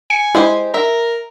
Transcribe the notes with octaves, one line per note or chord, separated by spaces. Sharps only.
G#5 C#7
G#3 E4 G4 C5
A#4 E5